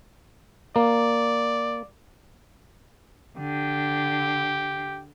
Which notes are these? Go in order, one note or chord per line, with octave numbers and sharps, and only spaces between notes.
A#3 D5
D3 G4